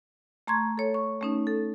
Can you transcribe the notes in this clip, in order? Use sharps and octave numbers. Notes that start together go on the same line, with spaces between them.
A3 A#5 C6 C#6 G#6
A4 C#5
C#6
A3 C#4 D#4
A4